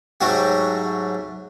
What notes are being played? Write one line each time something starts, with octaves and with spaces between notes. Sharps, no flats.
G#2 F#3 A3 F#4 G4